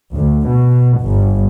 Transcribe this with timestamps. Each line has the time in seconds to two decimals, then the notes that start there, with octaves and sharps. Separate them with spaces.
0.14 D2
0.49 B2
1.01 G1